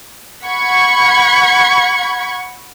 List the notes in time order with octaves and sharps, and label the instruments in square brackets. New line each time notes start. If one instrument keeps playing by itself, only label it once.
[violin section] F#5 B5 C#6 G#6